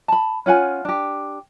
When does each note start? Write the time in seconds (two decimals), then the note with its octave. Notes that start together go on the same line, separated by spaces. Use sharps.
0.08 A5 B5
0.46 C#4 F4 F#5 G#5
0.85 D4 G4